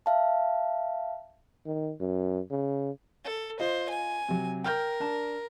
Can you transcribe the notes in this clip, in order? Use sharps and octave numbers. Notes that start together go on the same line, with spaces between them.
E5 F5 A5
D#3
F#2
C#3
A4
F4 C5 D#5
G#5
C3 F#3
A#4 G5 F6 G6
D4 A5